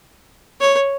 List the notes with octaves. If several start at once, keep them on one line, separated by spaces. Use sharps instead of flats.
C#5